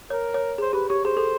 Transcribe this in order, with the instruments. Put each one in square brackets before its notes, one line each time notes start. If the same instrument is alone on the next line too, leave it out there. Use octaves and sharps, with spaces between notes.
[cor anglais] A#4 [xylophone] C#5
[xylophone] C#5
[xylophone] G#4 [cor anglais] C5
[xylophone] G4 [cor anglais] B4
[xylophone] G4 [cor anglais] C#5
[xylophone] G#4 [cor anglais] C5
[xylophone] A4